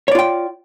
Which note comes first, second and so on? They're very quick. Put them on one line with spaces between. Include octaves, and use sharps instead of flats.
C#5 D5 F4 G5